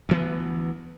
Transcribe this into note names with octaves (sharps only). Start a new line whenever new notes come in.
D2 E3 B3